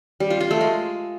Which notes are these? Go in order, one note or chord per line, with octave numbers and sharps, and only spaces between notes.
G3
F4
F4
A3
G#3